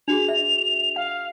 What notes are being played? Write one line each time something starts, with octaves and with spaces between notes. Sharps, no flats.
D4 F#4 G#4 F7
E5
F5 F#5